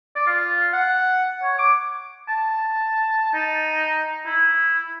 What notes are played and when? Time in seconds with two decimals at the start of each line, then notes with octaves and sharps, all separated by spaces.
0.16 D5
0.27 F4
0.73 F#5
1.43 C#5
1.59 D6
2.28 A5
3.34 D#4
4.26 E4